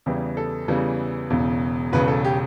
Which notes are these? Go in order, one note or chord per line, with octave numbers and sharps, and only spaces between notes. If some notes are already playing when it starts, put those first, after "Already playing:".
E2 C#3 E3 G3 G4
A4
E2 C#3 E3 G3
E1 E2 C#3
E1 E2 C#3 B4
A4
G4